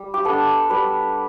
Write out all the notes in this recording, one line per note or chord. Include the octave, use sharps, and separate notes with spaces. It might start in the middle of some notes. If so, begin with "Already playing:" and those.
Already playing: G3
G4
B3 D4 A4
G3 B4